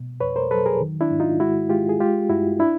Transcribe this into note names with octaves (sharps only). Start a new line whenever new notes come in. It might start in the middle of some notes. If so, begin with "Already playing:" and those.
Already playing: B2
F2 B4 C#5
A#4 C5
F#3 A4 B4
G#4 A#4
D#3
D4 E4
G#2
D#4 F4
G#3 E4 F#4
G#3 F4 G4
G#4
G#3 F4 G4
G2 E4 F#4
D4 E4